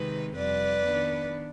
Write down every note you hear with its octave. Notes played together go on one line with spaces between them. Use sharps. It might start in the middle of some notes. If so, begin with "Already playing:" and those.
Already playing: C3 D#3 G#3 C4 D#4 B4
F2 C3 G3 B4 D5
D#3 B3 D4